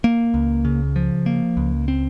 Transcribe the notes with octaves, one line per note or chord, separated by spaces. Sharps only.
A#3
C#2
C#3
F3
A#3
C#2
C4